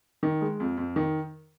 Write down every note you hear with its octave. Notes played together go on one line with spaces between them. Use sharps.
D#3
G#3
F2
F2
D#3